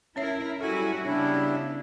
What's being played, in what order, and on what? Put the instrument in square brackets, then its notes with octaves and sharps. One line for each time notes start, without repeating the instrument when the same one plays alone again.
[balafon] C#4 C#5 E5 [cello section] E4 A#4
[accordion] F#3 G#5 [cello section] G3 E4 F#4 [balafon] A4
[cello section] C#3 B3 [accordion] G3 D4 E4 [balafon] C#5